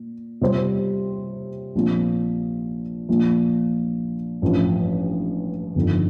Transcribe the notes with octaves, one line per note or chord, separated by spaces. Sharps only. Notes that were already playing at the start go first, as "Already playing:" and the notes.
Already playing: A#2
C3 G3 C4 F4 C5
A#1 A#2 F3 C4
A#1 A#2 F3
A1 G2 F3
G1 F2 D#3